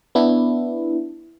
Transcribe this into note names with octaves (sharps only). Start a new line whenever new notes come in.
B3 D4 E4